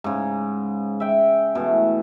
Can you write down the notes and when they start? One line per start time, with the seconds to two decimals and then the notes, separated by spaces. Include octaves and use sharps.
0.04 G#2 C#3
1.00 E5 G5
1.55 B2 E3 A3